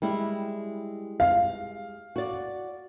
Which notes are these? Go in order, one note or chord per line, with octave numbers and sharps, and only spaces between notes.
G3 G#3 E4
F5
F#4 D5